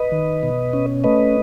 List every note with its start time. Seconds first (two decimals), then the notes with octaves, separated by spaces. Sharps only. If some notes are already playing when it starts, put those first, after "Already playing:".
Already playing: B4 D#5
0.12 D#3
0.43 B2
0.73 C#4
1.04 A3 B4 D#5